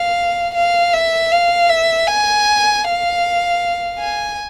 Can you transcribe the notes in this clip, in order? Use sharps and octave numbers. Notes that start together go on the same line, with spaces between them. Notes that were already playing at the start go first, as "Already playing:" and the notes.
Already playing: F5
F5
E5
F5
E5
G#5
F5
G#5